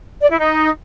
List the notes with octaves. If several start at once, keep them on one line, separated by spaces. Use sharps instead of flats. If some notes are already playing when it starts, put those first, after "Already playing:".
D5
E4
D#4